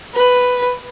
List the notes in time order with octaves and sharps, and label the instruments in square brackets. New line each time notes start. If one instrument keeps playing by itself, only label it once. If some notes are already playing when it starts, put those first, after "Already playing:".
[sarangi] B4